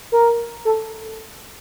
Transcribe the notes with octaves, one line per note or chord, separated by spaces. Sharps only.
A#4
A4